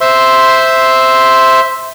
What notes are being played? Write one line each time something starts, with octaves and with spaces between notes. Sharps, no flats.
C5 E5 C6